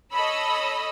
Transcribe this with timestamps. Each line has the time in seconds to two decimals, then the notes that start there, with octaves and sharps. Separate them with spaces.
0.13 A4 C#5 D#5 B5 E6